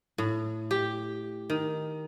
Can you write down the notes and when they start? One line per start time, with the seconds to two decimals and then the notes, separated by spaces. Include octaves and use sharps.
0.18 A2
0.71 G4
1.50 D#3